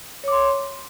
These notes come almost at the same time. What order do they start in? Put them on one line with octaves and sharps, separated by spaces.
C#5 D6 C6